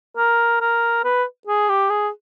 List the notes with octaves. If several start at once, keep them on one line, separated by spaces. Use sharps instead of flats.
A#4
A#4
B4
G#4
G4
G#4